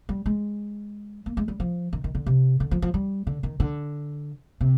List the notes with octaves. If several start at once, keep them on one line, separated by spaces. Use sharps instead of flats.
G3
G#3
A#3
G#3
G3
F3
D#3
D#3
D3
C3
D3
F3
F3
G3
D3
D#3
D3
C3